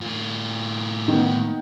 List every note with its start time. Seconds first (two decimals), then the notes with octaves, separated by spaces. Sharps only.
0.01 A2 F4
1.08 D#3 B3